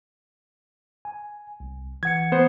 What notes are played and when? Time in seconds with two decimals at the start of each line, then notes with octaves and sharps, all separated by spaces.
1.05 G#5
1.60 C2
2.03 E3 F#5 G#6 C#7
2.32 B3 C5